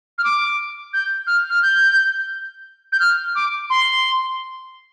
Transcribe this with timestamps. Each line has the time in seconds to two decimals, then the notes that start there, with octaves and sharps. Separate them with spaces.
0.18 F6
0.24 D6
0.93 G6
1.27 F6
1.50 F6
1.63 G6
2.92 G6
3.00 F6
3.35 D6
3.70 C6